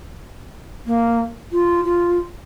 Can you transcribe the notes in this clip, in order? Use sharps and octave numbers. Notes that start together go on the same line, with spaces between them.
A#3
F4
F4